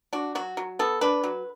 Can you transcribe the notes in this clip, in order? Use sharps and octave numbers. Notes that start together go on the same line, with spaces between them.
D4 F#4
F#3 F#4
F#3
B3 A4
D4 B4
F#3